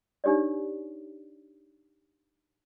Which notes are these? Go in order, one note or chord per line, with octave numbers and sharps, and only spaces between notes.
D4 D#4 G4 C#5 D5